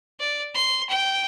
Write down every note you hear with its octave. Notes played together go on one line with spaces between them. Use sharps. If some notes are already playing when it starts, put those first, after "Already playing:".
D5
C6
G5